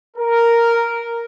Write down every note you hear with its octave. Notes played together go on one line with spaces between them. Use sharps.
A#4